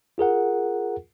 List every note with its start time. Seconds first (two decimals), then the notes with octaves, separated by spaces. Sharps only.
0.18 F4 G#4 A#4 F#5